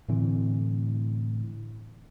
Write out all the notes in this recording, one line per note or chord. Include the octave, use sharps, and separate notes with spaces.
A2 D3 E3 C4